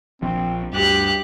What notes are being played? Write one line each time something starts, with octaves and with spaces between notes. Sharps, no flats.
A#1 F3 C4
D2 G2 G4 F#6